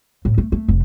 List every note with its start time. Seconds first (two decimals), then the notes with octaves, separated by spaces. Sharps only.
0.25 A2
0.38 A3
0.52 A3
0.68 F1